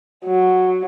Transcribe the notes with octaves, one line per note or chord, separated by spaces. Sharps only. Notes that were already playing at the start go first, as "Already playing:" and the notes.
F#3